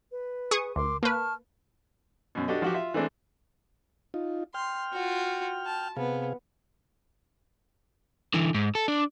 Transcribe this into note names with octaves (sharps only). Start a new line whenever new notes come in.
B4
G#4 C#6 D#6
D2 A#4 C6 D6
A#3 B4 A5 C#6 F6
F#2 B2
D4 F#4 G4 A4 D#5
F3 F#4 G4
F4 E5
E3 G#3 A3 C4 D4
D#4 F4
G5 C6 F6
F4 F#4
A5
C3 B3 G#4 F5
D3 E3
G#2
A4
D4